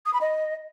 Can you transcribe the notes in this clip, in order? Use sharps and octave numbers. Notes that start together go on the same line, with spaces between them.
D#6
B5
D#5